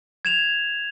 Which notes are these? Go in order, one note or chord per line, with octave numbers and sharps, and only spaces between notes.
G#6 E7 F7